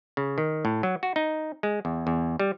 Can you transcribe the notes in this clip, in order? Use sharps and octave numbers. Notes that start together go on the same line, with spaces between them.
C#3
D#3
A2
F#3
F#4
D#4
G#3
E2
E2
G3